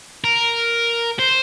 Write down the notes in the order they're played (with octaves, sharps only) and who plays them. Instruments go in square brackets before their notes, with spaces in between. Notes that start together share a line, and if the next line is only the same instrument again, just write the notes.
[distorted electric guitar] A#4
C5